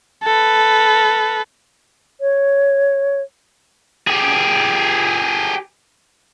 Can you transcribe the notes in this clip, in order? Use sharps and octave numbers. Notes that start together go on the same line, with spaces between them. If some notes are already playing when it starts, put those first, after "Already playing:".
A4 B4
C#5
G4 G#4